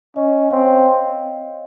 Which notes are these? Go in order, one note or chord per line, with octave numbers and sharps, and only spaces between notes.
C#4 D#5
C4 C#5 F5